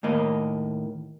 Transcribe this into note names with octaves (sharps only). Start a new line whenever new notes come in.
D#2 A2 A#3 D#5